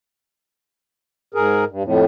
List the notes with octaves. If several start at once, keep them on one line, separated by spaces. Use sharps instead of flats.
G#2 G#4 A#4
G2
F2 A2